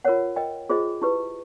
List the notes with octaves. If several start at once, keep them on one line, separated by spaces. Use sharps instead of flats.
F4 A#4 C#5 F#5
A#4 D#5 G5
F4 G#4 C5 D#5
E4 G4 B4